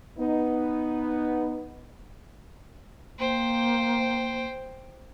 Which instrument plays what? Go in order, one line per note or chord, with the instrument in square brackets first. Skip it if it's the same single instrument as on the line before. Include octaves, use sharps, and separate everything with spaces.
[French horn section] B3 D#4
[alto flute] A#3 [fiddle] C5 G5